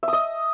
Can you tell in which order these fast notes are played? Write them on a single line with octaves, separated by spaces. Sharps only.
E5 D#6 D#5